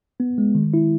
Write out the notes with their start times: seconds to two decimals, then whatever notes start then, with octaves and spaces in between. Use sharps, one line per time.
0.20 B3
0.38 G#3
0.55 D#3
0.74 E4